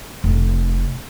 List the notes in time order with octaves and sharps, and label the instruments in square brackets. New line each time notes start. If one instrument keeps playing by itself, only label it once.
[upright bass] F1